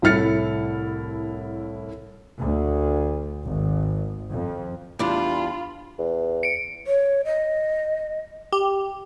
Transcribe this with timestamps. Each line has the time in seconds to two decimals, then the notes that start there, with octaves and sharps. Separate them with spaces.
0.02 C2 A2 E4 F6 A6 C#7
2.40 D2
3.46 G#1
4.34 F2
4.99 E2 G3 D4 F4 B5
5.99 E2
6.43 C#7 D7
6.87 C#5
7.25 D#5
8.52 G4